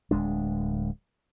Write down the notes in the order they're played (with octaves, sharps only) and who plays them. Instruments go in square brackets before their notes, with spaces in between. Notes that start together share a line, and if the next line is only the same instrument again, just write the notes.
[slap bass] D1 G#3 D4